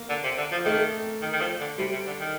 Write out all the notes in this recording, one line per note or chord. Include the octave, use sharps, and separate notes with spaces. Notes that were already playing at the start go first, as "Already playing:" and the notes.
Already playing: A#3
D3
C3
D3
F3
D#3 A3
D#3
D#3
F3
D3
C3 G3
C3
D3
D#3